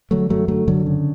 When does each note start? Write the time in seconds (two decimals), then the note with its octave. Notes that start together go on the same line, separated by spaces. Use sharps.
0.11 D3 F#3 A3
0.29 F#2 F#3 A3
0.48 D3 F#3 A3
0.67 F#2 D3 F#3
0.86 C#3